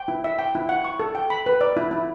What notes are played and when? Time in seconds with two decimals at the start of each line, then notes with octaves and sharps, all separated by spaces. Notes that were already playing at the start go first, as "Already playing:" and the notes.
Already playing: G5
0.08 E4
0.24 E5
0.39 G5
0.55 E4
0.69 F#5
0.84 C#6
1.00 A4
1.15 G5
1.30 B5
1.46 B4
1.61 D5
1.77 E4
1.91 E4